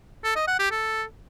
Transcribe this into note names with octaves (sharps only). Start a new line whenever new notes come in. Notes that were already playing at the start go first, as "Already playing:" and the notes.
A4
D#5
F#5
G4
A4